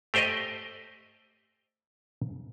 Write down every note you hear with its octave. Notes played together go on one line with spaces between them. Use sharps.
A3 G4 C5 D5 D#5